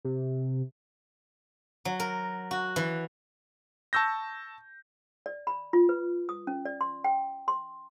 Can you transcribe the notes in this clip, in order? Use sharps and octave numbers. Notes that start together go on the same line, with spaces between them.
C3
F#3
A#4
F#4
E3
A5 C#6 E6 G6 A#6
D5
B5
F4
B4
D#6
C#4
D5
C6
G5
C6